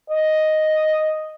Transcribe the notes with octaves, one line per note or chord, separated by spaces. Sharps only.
D#5